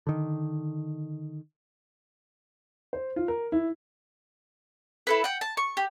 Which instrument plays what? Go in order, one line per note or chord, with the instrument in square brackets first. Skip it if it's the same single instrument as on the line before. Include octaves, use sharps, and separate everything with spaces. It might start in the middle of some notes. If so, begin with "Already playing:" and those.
[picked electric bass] D3 D#3
[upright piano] C5
F4
A#4
E4
[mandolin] E4 A4 B4
F#5 G5
A5
C#6
G4